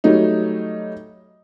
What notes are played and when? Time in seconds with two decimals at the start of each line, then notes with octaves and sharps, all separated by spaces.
0.04 F#3 G3 A3 D#4